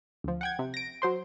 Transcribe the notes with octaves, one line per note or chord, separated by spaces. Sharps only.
D2 F3
F#5 G5 G#6
C3
A#6 D7
F#3 C5 C6